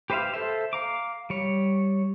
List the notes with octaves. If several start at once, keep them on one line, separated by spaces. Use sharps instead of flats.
G4 B4 C5 E5 F5
A4 C5 E5
F5 A#5 D6
G3 C#5